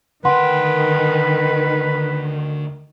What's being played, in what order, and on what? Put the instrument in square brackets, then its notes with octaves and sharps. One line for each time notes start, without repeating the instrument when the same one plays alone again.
[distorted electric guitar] D2 G5 [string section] D#3 [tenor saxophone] B4 [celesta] F#5 C6